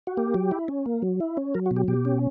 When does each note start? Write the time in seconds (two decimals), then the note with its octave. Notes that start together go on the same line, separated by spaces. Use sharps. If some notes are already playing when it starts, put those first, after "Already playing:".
0.07 F#4
0.17 A#3 G4
0.34 F#3
0.51 E4
0.68 C#4
0.86 A#3
1.02 F#3
1.20 E4
1.37 C#4
1.54 F#3 A#4
1.66 F#4
1.71 B2
1.76 G4
1.88 B2 G4
2.05 C#4